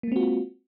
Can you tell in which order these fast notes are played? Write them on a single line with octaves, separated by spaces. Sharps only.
A#3 G#3 C4 F#4 F4